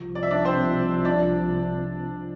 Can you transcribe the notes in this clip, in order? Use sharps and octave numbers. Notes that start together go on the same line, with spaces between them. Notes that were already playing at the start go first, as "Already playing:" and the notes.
Already playing: C2 C3 F3
D5
E5
D4 D5
C4 C5
D4 D5